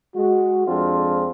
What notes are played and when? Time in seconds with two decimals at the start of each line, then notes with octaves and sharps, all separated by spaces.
0.14 G#3 F#4
0.66 F2 F3 G#3 C4 D4 F4